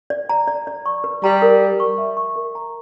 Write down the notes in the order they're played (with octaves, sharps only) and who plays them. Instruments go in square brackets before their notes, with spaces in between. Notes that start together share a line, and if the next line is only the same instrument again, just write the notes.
[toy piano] D5
A#5
D5
D5
C#6
B4
[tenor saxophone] G3 [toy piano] A#5
[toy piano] A#4
A#4
C#6
E5
C#6
A#4
A#5